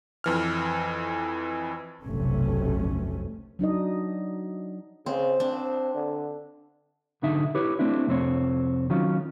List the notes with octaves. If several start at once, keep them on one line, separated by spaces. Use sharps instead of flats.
F2 E3 F6
F1 B1 G2 C3 A3 C#4
F#3 D4 D#4 D#5
C#3 C4
C4 D4
D3
B1 G#2 D3 D#4 E5
E4 G4 B4 C#5
A3 C4 D4 E4
C2 F2 C4 C#5
D#3 F#3 C#4 F4